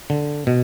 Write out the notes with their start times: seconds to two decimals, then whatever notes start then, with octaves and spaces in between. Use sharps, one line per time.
0.10 D3
0.47 B2